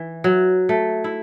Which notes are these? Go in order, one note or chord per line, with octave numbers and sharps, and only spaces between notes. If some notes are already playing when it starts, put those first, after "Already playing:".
Already playing: E3
F#3
A3
E4